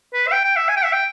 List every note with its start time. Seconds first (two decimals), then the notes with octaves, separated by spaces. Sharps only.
0.14 B4
0.27 E5
0.32 G5
0.45 G5
0.57 E5
0.69 G#5
0.76 G5
0.84 E5
0.93 G5